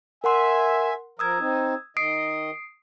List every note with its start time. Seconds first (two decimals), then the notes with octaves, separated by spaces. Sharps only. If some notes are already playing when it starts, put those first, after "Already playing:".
0.24 A#4 E5 F#5 G#5 C6
1.19 F3 A#4 D#6 E6 G#6
1.39 C4 D#4
1.97 D#3 D#5 D#6 C7 D7